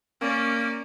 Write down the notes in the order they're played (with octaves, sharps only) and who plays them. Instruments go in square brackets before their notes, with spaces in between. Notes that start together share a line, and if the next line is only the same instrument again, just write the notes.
[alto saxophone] A#3 [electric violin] C#4 D5